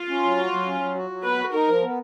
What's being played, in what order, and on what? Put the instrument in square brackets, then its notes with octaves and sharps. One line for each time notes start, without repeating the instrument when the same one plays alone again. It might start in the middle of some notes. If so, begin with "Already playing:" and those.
Already playing: [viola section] F4
[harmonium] C#4
F#3
F#4
F#3
C#4
F#3
F#4
F#3
[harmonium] B3 [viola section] B4
[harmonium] F#4
[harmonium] D#4 [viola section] A#4
[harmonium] F3
B3